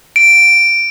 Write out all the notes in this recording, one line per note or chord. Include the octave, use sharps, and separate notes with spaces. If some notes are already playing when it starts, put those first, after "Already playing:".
D7